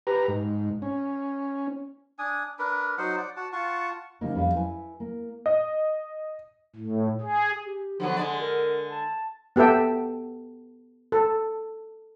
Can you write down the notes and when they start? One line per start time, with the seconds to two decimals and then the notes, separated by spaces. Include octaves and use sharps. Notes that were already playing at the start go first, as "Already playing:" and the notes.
0.07 G4 B4 A#5
0.28 G#2
0.82 C#4
2.19 D4 G#5 D#6
2.59 D4 A#4 B4
2.98 F#3 D#4 C5 F#5
3.17 D5 F#5
3.37 F#4 F#5 A5
3.53 F4 F#5 A5 C#6
4.21 C#3 F3 G3 A#3 D#4
4.35 F2 G3 F5
4.54 E4 B4 G#5
5.00 A#3
5.46 D#5
6.76 A2
7.21 G#4
7.66 G4
8.00 D3 F3 F#3 B3
8.16 D3 G#3 G#4 D5
8.42 A#4
8.91 A5
9.56 B3 G4 A4 E5 G5
11.12 A4